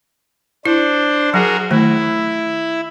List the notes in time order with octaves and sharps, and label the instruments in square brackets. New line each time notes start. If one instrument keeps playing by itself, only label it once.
[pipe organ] D4 C5 [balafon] E4
[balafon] F#3 [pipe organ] F#4 G#4 A#4
[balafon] D#3 A3 [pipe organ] E4